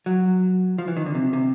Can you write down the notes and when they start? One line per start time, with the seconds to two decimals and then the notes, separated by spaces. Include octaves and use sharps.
0.06 F#3
0.78 F3
0.88 E3
0.97 D#3
1.06 D3
1.15 C3
1.33 C3